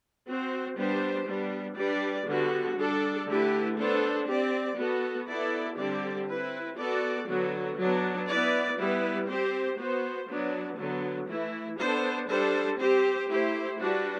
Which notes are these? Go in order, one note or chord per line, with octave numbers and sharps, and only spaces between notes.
C4 F#4 C5
G3 B3 D4 G4 C5
G3 B3 D4
G3 D4 G4 B4 D5
D3 G3 B3 F#4
G3 D4 A4 D5
D3 A3 E4 G4 B4
B3 D4 A4 C5
C4 G4 D5
B3 F#4 A4
B3 E4 A4 D5
D3 G3 C4 G4 D5
C4 E4 B4
B3 F#4 A4 D5
D3 F#3 B3 F#4
F#3 B3 D4
B3 E4 B4 D5
G3 B3 E4 B4
C4 G4 C5
B3 F#4 C5
F#3 B3 D4
D3 F#3 B3
E3 A3 E4
B3 D4 A4 C5
G3 D4 A4 C5
C4 G4 C5
A3 E4 G4 C5
G3 D4 F#4 B4